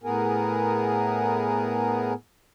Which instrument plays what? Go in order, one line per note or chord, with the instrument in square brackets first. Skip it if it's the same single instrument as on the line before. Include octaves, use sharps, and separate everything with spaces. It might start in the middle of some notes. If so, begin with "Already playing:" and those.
[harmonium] A2 B3 G#4 A#4